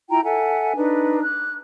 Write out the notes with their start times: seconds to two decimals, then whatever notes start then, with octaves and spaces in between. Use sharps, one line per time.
0.09 E4 F4 G5 A#5
0.24 A4 E5 F#5 G#5
0.76 D4 D#4 B4
1.23 D6 F#6